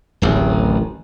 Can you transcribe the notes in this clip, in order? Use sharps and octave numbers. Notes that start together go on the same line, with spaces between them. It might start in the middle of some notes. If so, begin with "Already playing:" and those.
D1 A1 D#2